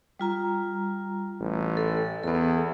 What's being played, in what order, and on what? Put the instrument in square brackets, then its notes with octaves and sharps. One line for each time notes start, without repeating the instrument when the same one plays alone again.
[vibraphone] G3 F4 A#5
[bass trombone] A1
[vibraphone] A4
[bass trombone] E2 [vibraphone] B3 A4